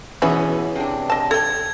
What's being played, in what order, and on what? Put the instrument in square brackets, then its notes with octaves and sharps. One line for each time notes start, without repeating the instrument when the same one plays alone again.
[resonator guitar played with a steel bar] B2 E3 [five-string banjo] B3 C#4 G#4 [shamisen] E5 B5
[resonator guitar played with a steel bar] C3 D4
[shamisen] D#5 A5
[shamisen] A4 G5 [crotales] G#6